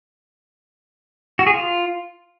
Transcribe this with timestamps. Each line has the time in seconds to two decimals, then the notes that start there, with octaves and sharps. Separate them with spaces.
1.39 F#4
1.47 G#4
1.54 F4